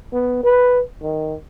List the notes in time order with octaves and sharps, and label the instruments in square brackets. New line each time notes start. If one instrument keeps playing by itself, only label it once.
[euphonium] B3
B4
D#3